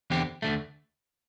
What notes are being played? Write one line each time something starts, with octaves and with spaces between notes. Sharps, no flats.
E2 D3 C4 G4
D2 D3 A3